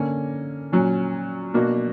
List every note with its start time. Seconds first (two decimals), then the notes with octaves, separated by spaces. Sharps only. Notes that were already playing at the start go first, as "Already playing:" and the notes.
Already playing: D3 A#3 C#4
0.72 A#2 F#3 C#4
1.54 B2 A#3 D4 F#4